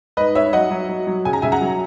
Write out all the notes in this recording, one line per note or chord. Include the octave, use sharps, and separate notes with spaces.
G#2 B4 D#5
G#2 C#5 E5
F#3 D#5 F#5
F#3
F#3
F#3
C#3 G#5
A#5
C#3 E5 G#5
F#5 A#5
F#3